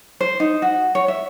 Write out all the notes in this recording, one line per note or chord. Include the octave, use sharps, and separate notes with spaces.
C5
D#4
F#4
C#5
E5